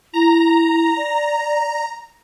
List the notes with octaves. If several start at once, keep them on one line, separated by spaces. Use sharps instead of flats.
E4 A#5
D5